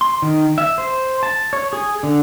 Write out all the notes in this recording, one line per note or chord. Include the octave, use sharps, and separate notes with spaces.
C6
D#3
E5
C5
A5
C#5
G#4
D3